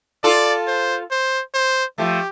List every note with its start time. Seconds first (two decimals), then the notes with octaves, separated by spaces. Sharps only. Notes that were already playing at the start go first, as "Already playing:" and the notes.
0.24 F4 A4 D5
0.68 C5
1.11 C5
1.55 C5
1.98 F3 A3 G4